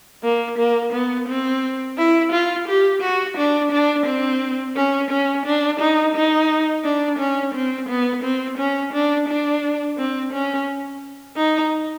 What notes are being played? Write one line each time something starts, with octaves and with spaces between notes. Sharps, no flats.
A#3
A#3
B3
C4
E4
F4
G4
F#4
D4
D4
C4
C#4
C#4
D4
D#4
D#4
D4
C#4
C4
B3
C4
C#4
D4
D4
C4
C#4
D#4